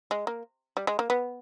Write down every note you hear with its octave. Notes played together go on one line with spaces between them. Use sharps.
G#3
A#3
G3
G#3
A#3
B3